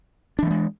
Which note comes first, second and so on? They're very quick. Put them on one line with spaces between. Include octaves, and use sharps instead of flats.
D4 E3 A3 G#3